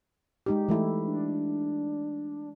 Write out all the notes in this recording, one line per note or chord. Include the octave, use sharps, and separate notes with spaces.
G#3 D#4 G4
E3 A3 E4
D4